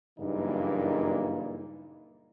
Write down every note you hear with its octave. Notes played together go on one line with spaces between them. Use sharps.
F#1 G2 A#2 E3 A#3 D#4